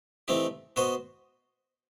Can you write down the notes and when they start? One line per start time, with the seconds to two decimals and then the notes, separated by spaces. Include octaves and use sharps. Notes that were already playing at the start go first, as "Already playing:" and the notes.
0.28 E3 A3 C4 D#4 G4
0.76 B3 F#4 C5 D#5